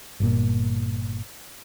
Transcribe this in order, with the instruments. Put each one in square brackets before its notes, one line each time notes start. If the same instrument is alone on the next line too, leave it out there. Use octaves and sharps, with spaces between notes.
[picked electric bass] G1 A#2